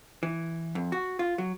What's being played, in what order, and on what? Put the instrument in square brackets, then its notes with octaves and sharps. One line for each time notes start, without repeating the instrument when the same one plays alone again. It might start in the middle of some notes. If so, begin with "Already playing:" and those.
[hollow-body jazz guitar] E3
F2
F#4
F4
F#3